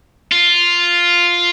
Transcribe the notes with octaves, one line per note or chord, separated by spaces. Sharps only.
F4